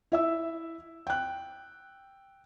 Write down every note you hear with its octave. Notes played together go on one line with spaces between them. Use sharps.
E4 E5 E6
G5 F#6